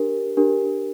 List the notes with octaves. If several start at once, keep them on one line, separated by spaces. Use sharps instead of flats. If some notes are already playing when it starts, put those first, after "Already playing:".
Already playing: D4 G4 A#4
D4 G4 A#4